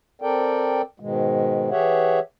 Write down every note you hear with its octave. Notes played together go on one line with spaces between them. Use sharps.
C4 A4 A#4 D5 G5
G#2 B2 D#3 G#3
E3 G4 G#4 C#5 E5 F#5